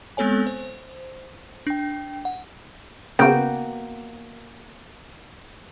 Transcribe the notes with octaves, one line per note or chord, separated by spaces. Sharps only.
G#3 B3 C4 A4 C#5 G#5
C5
D4 G5
F#5
C#3 A#3 B3 F#4 G5